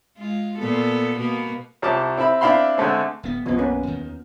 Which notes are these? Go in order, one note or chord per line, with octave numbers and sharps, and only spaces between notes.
G#3 F4
A#2 B3 A4
B2 A#3 B3
C2 F3 A5 D6
C4 E4 E5 B5
C4 D4 E4 F5 B5 C6
D3 G#3 A3 C4
D1 B3
B1 F#2 F3 B3
A#3 C#4 B4
D#2 D#3